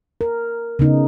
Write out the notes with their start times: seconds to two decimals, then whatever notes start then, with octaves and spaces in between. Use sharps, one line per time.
0.21 A#4
0.79 C#3 B3 D#4